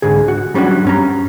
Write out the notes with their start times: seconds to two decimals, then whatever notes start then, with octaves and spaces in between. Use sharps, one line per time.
0.02 C2 G#2 D3 G#4
0.28 F#4
0.54 F#3 G3 C#4 D4 F#4
0.85 G2 C#4 A#5